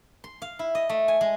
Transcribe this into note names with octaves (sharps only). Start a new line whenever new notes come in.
C6
F5
E4
D#5
A3
G#5
G#3